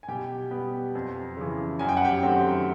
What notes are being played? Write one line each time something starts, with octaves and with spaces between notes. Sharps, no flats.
G#5
B2 G4 G5
G3 B3
F2
C#3 E3
F#2 G#5
G5
F#5
G4 G5
D#3 F#3 A3 C4